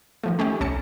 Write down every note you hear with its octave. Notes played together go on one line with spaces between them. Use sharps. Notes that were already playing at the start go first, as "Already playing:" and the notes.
D#3 F3 A3
A3 C#4 D#4 G4
C2 C#4 A5 C#7